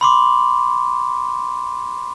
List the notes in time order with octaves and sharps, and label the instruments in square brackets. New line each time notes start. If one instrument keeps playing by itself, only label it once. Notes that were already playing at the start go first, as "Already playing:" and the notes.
[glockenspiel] B5 C6 D6